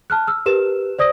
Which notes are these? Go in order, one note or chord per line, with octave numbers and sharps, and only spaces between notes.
A5 F6 F#6
E6 F6
G4 A#4 B4 E7
C5 D5 D#6 A#6